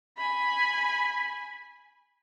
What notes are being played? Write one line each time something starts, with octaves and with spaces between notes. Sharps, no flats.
G#5 B5